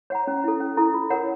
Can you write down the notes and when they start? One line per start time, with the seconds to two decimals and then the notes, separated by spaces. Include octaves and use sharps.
0.10 C#5 F#5 A#5
0.27 C#4
0.44 E4 A4
0.60 C#4
0.77 E4 A4
0.94 F4
1.10 A#4 C#5 F#5